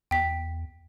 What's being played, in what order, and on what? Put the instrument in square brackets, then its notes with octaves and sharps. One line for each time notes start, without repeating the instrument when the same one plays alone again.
[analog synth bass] E2 [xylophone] G5 B6